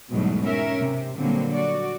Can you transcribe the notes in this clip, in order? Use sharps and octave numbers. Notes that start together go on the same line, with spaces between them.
E2 G#2 B2 F#3 G3 A3
C#4 A#4 E5
C3
A#2 D3 F#3 G3 A#3 C4
F#4 D5